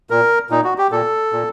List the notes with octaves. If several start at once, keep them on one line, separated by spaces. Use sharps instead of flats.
A#2 A#4
A#2 D#4
F#4
G4
A#2 A4
A#2